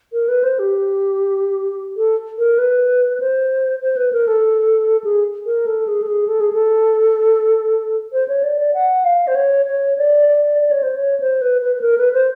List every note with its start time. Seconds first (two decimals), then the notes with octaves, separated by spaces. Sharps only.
0.13 A#4
0.28 B4
0.43 C5
0.59 G4
1.97 A4
2.38 A#4
2.58 B4
3.20 C5
3.81 C5
3.96 B4
4.12 A#4
4.27 A4
5.04 G#4
5.46 A#4
5.66 A4
5.87 G#4
6.02 A4
6.07 G#4
6.28 A4
6.40 G#4
6.53 A4
8.12 C5
8.28 C#5
8.43 D5
8.59 D5
8.74 F#5
9.04 F5
9.27 C5
9.35 C#5
9.66 C#5
9.98 D5
10.28 D5
10.59 D5
10.71 C#5
10.83 C5
10.96 C#5
11.20 C5
11.41 B4
11.61 B4
11.76 B4
11.81 A#4
11.98 B4
12.13 C5